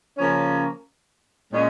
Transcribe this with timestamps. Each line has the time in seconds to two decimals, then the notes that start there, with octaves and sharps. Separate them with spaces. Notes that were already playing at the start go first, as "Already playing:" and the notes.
0.16 C#3 F3 A#3 C#4
1.51 A#2 G#3 C#4